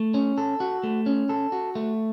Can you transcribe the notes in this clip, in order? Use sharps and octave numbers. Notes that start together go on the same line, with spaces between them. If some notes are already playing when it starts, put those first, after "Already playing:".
Already playing: A3
C#4
A4
F#4
A3
C#4
A4
F#4
A3